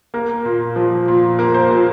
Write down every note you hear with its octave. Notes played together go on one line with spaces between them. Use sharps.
A#3 A#4
A#2
F3
A#2
A#3 A#4
C5
A#2 A#4